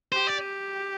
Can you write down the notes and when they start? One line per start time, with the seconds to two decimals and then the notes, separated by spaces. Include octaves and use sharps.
0.12 G4 C5
0.27 D5